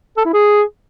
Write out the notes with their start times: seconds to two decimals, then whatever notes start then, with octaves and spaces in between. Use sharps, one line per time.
0.17 A4
0.25 E4
0.34 G#4